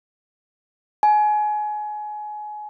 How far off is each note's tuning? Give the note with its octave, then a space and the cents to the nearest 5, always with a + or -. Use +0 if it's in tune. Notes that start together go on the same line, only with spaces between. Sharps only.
G#5 +25